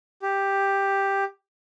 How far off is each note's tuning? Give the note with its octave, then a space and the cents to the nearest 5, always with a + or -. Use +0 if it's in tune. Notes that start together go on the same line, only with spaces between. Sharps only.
G4 +5